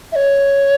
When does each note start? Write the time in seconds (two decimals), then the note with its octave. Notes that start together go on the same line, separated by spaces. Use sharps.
0.12 E5
0.16 C#5